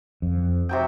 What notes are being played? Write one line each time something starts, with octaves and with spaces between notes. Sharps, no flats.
F2
C3 F#3 G5